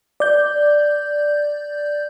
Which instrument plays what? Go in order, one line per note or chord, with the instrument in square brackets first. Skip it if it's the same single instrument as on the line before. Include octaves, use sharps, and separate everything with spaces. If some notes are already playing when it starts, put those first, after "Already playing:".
[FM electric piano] D5 G6